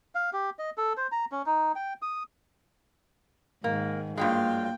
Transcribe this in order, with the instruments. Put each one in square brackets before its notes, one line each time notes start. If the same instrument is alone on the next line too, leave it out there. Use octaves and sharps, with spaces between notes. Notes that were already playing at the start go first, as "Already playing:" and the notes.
[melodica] F5
G4
D#5
A4
C5
A#5
C#4
D#4
G5
D#6
[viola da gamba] G#2 D#3 [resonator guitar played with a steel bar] A#3
[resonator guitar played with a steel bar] G2 F#3 G#3 [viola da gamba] A#3 [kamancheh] F4 [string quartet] G5